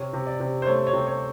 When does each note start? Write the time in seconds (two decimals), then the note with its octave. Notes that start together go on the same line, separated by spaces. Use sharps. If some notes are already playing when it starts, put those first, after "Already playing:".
Already playing: C3 C#5
0.13 C3
0.27 D5
0.40 C3
0.62 C5
0.67 A3 C#5
0.87 C#5
0.93 C3
1.07 C#5